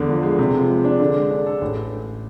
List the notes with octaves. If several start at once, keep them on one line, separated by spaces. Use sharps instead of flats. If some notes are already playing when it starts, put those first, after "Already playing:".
Already playing: E2 D3
F3
G#3
C3
F3
G#3
D4
D3
G#3
D4
A4
A1